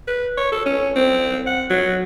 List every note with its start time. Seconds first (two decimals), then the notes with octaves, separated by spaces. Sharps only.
0.08 B4
0.37 C#5
0.52 A4
0.66 C#4
0.96 C4
1.47 F#5
1.70 F#3